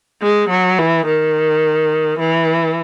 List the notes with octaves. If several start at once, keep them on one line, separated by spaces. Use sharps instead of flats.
G#3
F#3
E3
D#3
E3